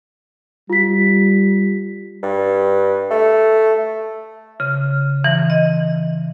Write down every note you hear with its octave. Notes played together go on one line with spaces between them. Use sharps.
G3 F4 B6
G2
A3
C#3
E3
D#5